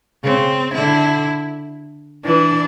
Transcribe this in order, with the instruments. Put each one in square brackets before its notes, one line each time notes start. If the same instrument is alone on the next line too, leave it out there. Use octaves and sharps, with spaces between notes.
[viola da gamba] C#3 [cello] C4
[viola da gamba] D3 [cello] E4
[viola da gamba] E3 [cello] D4